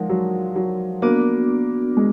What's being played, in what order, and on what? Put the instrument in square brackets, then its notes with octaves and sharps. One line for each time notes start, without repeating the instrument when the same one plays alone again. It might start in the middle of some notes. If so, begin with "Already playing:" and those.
Already playing: [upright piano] F3 G#3 [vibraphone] D#4 A#4 D5 F#5
[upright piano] F#3
F#3
[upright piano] A#3 [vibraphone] B3 D4 F#4 D5
[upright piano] G#3